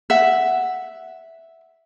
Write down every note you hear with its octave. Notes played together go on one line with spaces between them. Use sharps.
E5 F#5